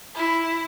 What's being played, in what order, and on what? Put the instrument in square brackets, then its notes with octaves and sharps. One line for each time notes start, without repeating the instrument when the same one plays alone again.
[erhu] E4